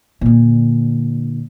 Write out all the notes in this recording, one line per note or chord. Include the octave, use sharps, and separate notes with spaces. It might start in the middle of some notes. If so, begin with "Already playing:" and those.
A#2 D3